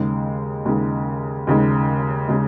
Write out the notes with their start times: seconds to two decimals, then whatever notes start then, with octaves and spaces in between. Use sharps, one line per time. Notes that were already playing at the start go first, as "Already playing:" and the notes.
Already playing: D#2 C#3 G#3
0.65 D#2 C#3 G#3
1.47 D#2 C#3 G#3
2.28 C#3 G#3